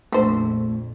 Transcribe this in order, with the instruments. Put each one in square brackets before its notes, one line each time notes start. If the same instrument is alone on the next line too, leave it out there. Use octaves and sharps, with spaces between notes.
[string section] A#1 F2 [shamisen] D3 C5 [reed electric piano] A3